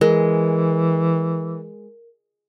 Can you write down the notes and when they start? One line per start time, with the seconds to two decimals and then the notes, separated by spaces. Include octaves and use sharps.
0.01 E3 G#3 A#4